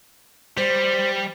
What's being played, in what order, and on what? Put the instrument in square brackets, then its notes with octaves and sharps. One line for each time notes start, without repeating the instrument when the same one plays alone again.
[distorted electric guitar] G3 [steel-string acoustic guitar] C5